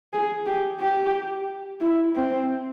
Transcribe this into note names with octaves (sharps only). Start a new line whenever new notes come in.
G#4
G4
G4
E4
C4